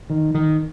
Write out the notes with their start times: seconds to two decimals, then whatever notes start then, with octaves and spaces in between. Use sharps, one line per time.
0.10 D#3
0.35 D#3